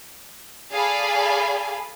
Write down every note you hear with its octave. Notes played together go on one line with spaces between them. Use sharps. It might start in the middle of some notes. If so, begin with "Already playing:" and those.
G#4 A4 D5 F5 G#5 B5